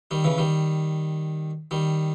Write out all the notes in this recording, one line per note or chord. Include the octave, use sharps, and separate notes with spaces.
D#3 G3
C#3 E3
D#3 G3
D#3 G3